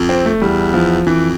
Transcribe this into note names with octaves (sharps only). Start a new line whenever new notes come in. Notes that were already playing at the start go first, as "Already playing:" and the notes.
Already playing: F2
C4
A3
E2 G3
F3
F2 E3